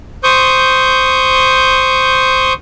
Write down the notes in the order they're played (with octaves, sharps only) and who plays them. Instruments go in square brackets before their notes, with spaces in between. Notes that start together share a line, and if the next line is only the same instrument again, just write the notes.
[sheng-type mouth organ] C5 C#6 D#6 G6